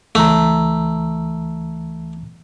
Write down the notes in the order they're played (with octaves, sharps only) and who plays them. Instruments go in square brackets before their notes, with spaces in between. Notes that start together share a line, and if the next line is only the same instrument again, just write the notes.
[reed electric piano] C#2 E3 A#5 [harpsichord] A3